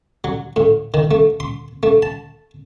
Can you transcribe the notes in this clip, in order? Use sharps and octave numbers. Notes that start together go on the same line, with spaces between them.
F#3
A2
D#3
A3
C6
A3
A5